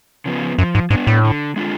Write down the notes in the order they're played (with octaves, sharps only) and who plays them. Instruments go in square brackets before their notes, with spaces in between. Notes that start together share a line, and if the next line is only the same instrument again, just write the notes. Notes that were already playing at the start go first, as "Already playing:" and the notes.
[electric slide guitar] C#3 F3 B3
[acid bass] F#2 [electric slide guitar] F3
[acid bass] G#2
[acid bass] G#2 [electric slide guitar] B3 D4
[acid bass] A2
[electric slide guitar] D3
G#3 D4 F4